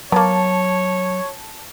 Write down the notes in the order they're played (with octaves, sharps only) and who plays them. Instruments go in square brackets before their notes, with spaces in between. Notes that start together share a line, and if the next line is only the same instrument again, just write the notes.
[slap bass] F#3 [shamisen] A#3 B3 [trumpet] C#5 [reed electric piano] A5